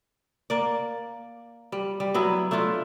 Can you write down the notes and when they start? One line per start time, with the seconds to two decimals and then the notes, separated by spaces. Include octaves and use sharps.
0.50 A#3 D5
1.72 G3
2.00 G3
2.14 F#3 B3 E4
2.51 A3 D4 E4 F4